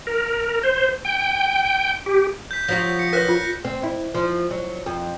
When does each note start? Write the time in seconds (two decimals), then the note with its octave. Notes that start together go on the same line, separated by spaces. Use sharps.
0.07 A#4
0.63 C5
1.05 G5
2.06 G4
2.51 G6 B6
2.68 F3 F#3 F#4 A#6 B6
2.99 C#7
3.13 A#4 B4 C#5 F#6 A#6 B6
3.29 F4
3.65 C4
3.83 E4
4.14 F3
4.51 F#3
4.86 F2